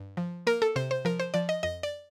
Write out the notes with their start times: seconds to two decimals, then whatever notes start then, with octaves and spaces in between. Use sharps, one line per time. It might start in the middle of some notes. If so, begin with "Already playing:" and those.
Already playing: G2
0.17 F3
0.47 A#3 A#4
0.62 A4
0.76 C3 C5
0.91 C5
1.05 F3 A#4
1.20 C5
1.34 F3 D5
1.49 D#5
1.63 F2 D#5
1.83 D5